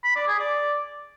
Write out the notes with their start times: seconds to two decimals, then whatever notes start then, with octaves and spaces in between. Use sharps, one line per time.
0.04 B5
0.16 D5
0.28 G#4
0.39 D5